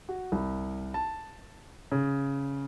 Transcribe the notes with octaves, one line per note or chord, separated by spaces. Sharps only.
F#4
C2
A5
C#3